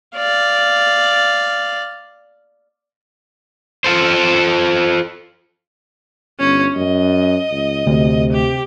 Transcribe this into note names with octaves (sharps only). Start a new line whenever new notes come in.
D5 F5
F4 A4 C5
G1 C#4
F#2 D#5
C#2
D2 C3
G4